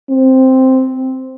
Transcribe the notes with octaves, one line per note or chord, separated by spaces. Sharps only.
C4